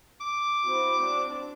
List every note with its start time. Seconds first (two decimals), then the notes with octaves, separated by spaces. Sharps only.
0.21 D6
0.64 C4 E4 F#4
1.01 C4 D4